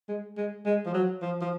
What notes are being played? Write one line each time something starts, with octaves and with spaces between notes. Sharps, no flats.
G#3
G#3
G#3
F3
F#3
F3
F3